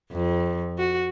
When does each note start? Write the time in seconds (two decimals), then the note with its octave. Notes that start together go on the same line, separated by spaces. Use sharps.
0.12 F2
0.78 F#4